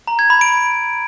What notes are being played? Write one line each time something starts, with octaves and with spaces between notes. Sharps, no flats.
A#5
G#6
B5
D7